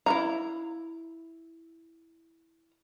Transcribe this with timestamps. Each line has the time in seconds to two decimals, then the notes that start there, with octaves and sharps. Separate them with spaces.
0.06 E4 F5 A#5